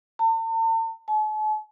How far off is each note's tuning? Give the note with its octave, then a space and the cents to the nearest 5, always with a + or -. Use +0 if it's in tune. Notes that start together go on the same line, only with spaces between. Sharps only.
A5 +45
A5 -45